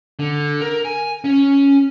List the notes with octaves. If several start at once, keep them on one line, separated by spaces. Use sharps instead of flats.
D3
A#4
G#5
C#4